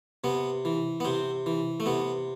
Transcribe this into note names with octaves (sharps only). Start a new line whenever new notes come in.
C3 B3
E3
B3
C3 C4
E3
A3
C3 B3